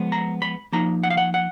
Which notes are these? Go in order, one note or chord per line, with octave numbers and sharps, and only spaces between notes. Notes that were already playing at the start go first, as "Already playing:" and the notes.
Already playing: F3 G#3 B3
A#5
B5
F3 A#3 D#4 A#5
F#5
F5
F#5
F#5